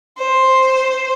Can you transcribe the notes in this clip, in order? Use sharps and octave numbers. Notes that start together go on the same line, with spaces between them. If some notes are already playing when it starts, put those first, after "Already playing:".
C5